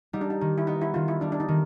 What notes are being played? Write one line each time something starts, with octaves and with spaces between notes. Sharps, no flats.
G3 D#4
D4
D#4
D#3
E4
B3 D#4
E4
D#3 F4
E4
G3 D4
D4
D#4
D#3